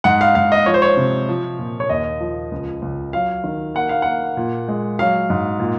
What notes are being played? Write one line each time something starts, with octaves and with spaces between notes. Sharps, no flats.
G#2 F#5
F5
G#2 F5
D#5
F3 C#5
C5
C#5
C3
F3
A#2
C#5
D#2 D#5
F3
C#2
C#2
F#3 F5
D#3
A#3 F#5
F5
A#3 F#5
A#2
G#3
F#3 F5
G#2
A#2